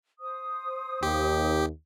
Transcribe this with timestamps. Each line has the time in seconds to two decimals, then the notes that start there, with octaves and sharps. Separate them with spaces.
0.20 C5 D#6
1.03 D#2 G4